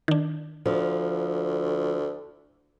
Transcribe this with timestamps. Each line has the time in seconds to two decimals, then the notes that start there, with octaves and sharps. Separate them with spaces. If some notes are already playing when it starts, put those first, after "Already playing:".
0.08 D#3 D4
0.66 D2 F3